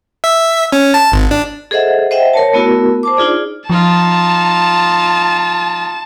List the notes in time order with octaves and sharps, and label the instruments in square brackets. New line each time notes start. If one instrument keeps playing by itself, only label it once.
[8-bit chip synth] E5
C#4
A5
G#1
D4
[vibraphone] G#4 A4 C5 D#5 E5 F#5
C5 D#5 E5 F#5 G5
A#4 C#5 A5
A3 B3 E4 F#4 A#4
C5 A5 D6
D4 D#4 F4 G#4 D5
[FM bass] F3 [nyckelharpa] D#4 F4 [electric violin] A5